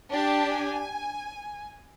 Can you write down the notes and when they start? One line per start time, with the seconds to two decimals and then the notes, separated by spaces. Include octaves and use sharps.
0.10 D4 G4 A5
0.52 G#5